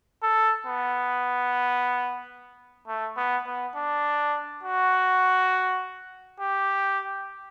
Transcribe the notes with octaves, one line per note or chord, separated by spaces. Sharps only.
A4
B3
A3
B3
B3
D4
F#4
G4